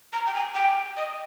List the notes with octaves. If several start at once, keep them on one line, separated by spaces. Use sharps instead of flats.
A#5
G5
G#5
G5
D#5